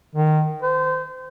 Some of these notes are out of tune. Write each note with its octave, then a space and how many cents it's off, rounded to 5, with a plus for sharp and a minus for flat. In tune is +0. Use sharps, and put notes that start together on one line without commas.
D#3 -15
C5 -30